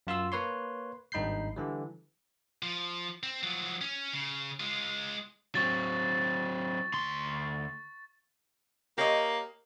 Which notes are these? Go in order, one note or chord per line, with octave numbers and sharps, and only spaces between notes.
F#2 F4 C6 E6
A#3 B4 C#5 C6
G#1 G2 D#4 B5 G6 C7
D3 E3 G3
F3
C4
F3 F#3
C#4
C#3
G#3 F4
F#3 C4 C#6 A6
D2 C6
A#3 G4 C#5 D#5